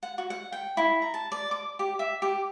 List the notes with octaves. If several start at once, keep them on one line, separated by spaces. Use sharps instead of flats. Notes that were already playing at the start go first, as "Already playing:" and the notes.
F#5
F#4
F#5
G5
E4
A#5
A5
D5
D6
G4
E5
G4